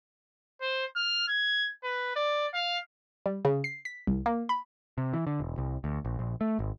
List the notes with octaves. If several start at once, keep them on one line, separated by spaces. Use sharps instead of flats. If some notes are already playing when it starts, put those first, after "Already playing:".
C5
F6
G#6
B4
D5
F5
G3
C#3
C7
B6
C2
A#3
B5
C3
E3
D3
E1
C2
D2
A#1
A#1
A3
G#1